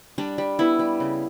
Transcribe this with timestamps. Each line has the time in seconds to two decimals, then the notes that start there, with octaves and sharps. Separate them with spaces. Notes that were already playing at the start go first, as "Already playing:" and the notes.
0.18 G3 D4
0.38 G3
0.59 B3 E4
0.79 G3
1.00 C#3